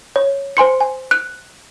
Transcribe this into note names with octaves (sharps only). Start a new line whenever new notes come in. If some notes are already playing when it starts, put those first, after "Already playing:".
C#5
C5 G#5 C6 C#7
G#5
F#6